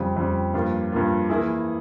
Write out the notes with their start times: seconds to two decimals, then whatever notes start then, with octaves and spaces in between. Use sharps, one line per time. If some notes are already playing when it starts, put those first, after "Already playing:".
Already playing: F2 C#3 G3
0.16 F2 C#3 G3
0.54 G2 F3 A#3 F4
0.92 G2 F3 A#3 F4
1.29 E3 A#3 E4 G#4